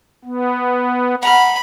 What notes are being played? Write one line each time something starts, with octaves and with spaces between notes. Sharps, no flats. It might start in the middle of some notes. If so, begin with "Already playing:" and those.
B3
F#5 A#5 B5 F6